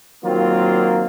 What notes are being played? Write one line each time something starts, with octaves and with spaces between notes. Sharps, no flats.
D#3 F#3 A#3 C4 F4